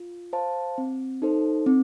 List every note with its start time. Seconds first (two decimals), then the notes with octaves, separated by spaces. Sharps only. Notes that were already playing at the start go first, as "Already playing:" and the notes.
Already playing: F4
0.33 C5 F5 A5
0.78 C4
1.22 D#4 A4 C5
1.66 C4